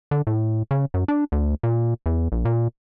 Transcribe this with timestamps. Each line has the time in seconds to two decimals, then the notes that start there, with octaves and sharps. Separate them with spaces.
0.11 D3
0.27 A2
0.71 C#3
0.94 F#2
1.08 D4
1.32 D2
1.63 A#2
2.06 E2
2.32 A#1
2.45 A#2